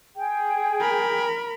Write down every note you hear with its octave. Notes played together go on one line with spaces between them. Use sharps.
G#4 G5
A#4 B5